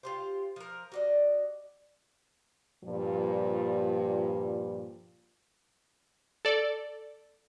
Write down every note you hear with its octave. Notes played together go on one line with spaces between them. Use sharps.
F4 G4 C5
F3 A#4
F#4 D5 D#5
G2 A#2 F3 G3
A4 D5